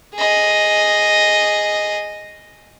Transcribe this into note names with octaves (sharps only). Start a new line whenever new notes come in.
G#4 D#5